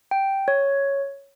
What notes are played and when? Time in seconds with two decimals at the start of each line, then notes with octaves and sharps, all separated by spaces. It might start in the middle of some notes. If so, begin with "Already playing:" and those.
0.11 G5
0.48 C#5